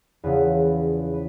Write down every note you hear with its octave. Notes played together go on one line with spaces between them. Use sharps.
E2 C#3 F3 B4
B4